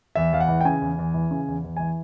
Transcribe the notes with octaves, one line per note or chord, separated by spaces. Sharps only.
E2 E5
E2 F5
F#5
E3
G5
C#3 G#5
E2
E2
E3
C#3
E2
E2
E3 G#5